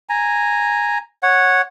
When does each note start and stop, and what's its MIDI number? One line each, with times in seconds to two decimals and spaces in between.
0.09 0.98 80
0.09 0.98 82
1.23 1.62 73
1.23 1.62 78